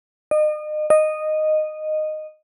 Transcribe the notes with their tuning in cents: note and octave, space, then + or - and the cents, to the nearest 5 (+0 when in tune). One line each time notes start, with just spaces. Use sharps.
D#5 -35
D#5 -10